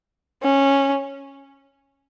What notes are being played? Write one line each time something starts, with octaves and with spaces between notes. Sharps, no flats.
C#4